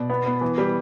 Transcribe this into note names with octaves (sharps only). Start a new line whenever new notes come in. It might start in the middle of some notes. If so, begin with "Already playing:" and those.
Already playing: B2 D5
B3
B3
E3
G3